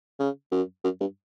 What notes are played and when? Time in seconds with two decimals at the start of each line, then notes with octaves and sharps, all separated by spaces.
0.20 C#3
0.52 F#2
0.84 F#2
1.01 G2